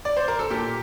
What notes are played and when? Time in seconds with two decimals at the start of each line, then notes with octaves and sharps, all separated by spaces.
0.05 D5
0.17 C5
0.28 A#4
0.39 A4
0.50 A#2 G4